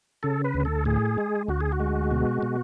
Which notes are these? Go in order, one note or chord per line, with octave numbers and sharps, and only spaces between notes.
C#3 A4
B4
D2
A4
A2 G#4
G#3
D2 F#4
G#4
F#4
G#3
B2
B2